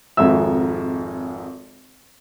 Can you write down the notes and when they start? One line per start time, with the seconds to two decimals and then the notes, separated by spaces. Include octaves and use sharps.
0.17 G#1 F2 G#2 E5 E6